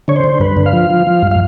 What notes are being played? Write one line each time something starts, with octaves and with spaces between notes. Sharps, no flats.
D3 C#5
C5
D3
G2 B4
D3
F5
F3
F3
F3
G2
F5